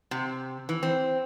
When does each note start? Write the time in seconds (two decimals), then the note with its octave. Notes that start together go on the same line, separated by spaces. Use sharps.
0.11 C3
0.69 E3
0.83 C4